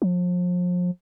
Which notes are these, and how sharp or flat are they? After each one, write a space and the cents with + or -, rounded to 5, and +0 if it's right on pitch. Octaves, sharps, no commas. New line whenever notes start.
F3 +35